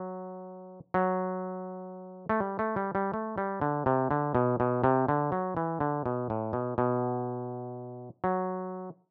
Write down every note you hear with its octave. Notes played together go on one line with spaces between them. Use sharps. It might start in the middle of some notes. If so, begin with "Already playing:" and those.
Already playing: F#3
F#3
A3
G3
A3
G3
G3
A3
G3
D3
C3
D3
B2
B2
C3
D3
F#3
E3
D3
B2
A2
B2
B2
F#3